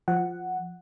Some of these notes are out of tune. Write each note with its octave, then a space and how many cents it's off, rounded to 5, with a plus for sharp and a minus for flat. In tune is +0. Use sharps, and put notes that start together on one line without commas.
F3 +0 F#5 +0